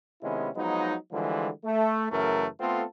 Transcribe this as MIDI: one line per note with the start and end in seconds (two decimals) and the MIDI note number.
0.22 0.49 48
0.22 0.49 51
0.22 0.49 56
0.22 0.49 59
0.22 0.49 61
0.22 0.49 64
0.55 0.95 53
0.55 0.95 54
0.55 0.95 56
0.55 0.95 59
0.55 0.95 63
1.12 1.49 50
1.12 1.49 52
1.12 1.49 53
1.12 1.49 55
1.12 1.49 56
1.65 2.07 57
2.11 2.46 42
2.11 2.46 49
2.11 2.46 52
2.11 2.46 57
2.11 2.46 70
2.60 2.84 57
2.60 2.84 59
2.60 2.84 60
2.60 2.84 65
2.60 2.84 69